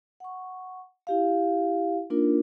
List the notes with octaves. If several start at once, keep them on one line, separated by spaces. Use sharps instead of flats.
F#5 C#6
E4 G4 F5
A#3 D4 D#4 F4 A#4